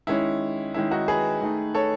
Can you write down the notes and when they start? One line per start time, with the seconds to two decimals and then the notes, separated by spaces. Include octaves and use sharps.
0.07 D#3 G#3 C#4 E4
0.74 D#3 G#3 C#4 E4
0.91 D#4 F#4
1.08 G#4 B4
1.41 D#3 A3 D#4
1.75 A4 C#5